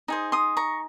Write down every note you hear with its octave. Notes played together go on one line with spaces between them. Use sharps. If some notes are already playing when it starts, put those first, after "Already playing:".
D#4 G#4 C5
C6 D#6
A#5 C#6